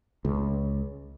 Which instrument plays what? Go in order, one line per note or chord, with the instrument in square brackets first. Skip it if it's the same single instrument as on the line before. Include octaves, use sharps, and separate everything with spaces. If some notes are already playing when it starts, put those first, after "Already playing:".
[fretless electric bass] C#2